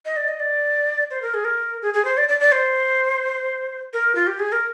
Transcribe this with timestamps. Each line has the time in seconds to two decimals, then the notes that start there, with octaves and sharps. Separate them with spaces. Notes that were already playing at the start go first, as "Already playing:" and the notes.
0.05 D#5
0.17 D5
0.28 D#5
0.40 D5
1.11 C5
1.22 A#4
1.34 G#4
1.45 A#4
1.82 G#4
1.94 G#4
2.05 C5
2.17 D5
2.29 D5
2.40 D5
2.52 C5
3.93 A#4
4.15 F4
4.27 G4
4.39 G#4
4.52 A#4